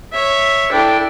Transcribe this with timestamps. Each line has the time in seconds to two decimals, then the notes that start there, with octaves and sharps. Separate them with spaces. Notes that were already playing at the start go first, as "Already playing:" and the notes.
0.12 C#5 E5
0.72 D4 E4 A4 G5